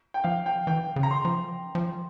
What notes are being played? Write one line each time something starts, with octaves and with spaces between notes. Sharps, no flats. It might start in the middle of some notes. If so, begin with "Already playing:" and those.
G5
F3 F5
G5
E3 G5
C#3
A#5
C6
F3
F3